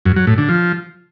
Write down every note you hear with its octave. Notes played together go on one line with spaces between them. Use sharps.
F#2
F#3
A2
D3
F3